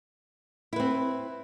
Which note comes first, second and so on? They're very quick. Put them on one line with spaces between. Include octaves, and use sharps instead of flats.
E4 B4 C4